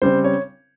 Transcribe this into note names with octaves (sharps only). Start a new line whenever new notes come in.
C#3 G3 C4 C5
C#5